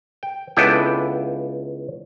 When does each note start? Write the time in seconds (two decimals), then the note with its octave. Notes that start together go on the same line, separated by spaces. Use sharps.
0.23 G5
0.57 C#2 B3 D4 E4 A4 G5